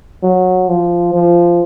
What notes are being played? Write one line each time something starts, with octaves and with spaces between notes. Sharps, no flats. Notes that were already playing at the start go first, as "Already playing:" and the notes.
F#3
F3
F3